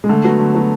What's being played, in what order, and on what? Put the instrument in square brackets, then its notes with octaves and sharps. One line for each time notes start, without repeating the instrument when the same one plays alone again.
[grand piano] G#3
[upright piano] D3 [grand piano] A3
[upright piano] F#3 B3 F#4
D3
F#3 B3 F#4